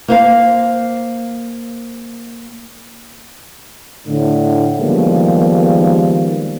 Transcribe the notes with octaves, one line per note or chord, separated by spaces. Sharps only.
A#3 C5 F5
A2 D3
D#3 F3 G3 G#3 A#3 B3